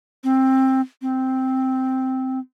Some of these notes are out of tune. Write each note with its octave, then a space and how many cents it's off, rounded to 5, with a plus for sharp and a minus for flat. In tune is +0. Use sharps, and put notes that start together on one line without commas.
C4 +15
C4 +0